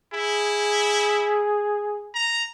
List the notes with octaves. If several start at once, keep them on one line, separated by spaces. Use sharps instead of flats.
E4 G#4
A#5